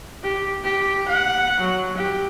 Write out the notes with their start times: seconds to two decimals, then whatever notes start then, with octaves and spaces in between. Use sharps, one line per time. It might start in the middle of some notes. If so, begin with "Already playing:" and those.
0.24 G4
0.64 G4
1.08 F#5
1.60 F#3
1.97 G4